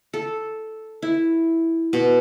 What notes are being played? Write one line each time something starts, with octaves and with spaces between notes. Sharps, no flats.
A4
E4
B2